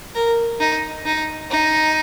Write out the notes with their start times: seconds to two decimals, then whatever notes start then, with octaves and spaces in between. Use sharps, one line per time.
0.15 A#4
0.60 D#4
1.06 D#4
1.51 D#4